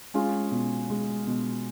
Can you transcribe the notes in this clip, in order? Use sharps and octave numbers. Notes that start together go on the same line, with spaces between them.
G#3 C#4 F4
B2
G#3
B2